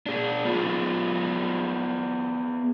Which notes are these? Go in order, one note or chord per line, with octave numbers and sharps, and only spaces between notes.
D4 G#4
B3 F4 G#4